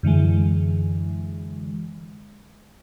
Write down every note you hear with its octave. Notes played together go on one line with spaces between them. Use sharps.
F#2 D3 E3 G#3